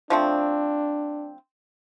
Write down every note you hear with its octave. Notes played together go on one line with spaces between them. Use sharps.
F3 A3 C4 D4